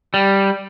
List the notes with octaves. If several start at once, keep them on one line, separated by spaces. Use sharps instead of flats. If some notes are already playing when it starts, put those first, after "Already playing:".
G3